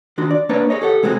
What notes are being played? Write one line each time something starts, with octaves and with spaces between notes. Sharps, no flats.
D#3 D4 F#4 C6
D5
A#3 D4 B4 C#5 D5
G#4 A#4 C#5 D#5
G4 A4 F#5
C3 G#3 B3 C4 F#4 G#4